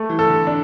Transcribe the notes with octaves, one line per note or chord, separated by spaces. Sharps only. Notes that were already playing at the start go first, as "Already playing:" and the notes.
Already playing: A3
E3
A4
D3
D4